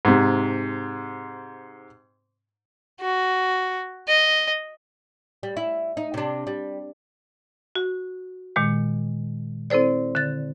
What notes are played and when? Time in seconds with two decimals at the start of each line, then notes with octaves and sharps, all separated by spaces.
0.05 G#2 C3
3.01 F#4
4.08 D#5
5.43 G3
5.57 E4
5.97 D#4
6.14 C3 D4
6.47 G3
7.75 F#4
8.56 A#2 D#3 G#3
9.70 C4 E4 A4 C5 D5
10.15 D3 A6